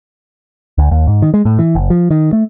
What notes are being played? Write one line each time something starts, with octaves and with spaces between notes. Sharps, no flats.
D2
D#2
G#2
D#3
G#3
A2
E3
F#1
F3
D#3
A3